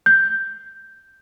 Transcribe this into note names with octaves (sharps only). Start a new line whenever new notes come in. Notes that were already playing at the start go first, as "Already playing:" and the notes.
G6